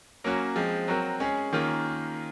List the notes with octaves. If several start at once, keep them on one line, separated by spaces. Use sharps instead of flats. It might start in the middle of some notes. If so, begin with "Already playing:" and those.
F#3 A#3 C#4 F#4
F3 G#3 C4
F#3 C4 F#4 A#4
G#3 C#4 G#4
D#3 A#3 C#4 F4 G#4